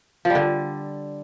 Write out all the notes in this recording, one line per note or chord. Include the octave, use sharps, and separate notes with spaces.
F3
G3
D3